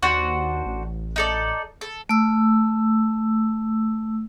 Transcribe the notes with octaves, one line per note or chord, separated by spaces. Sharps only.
D#2 D4 F#4 C5
A1
D#4 A4 D5
A4
A3 E6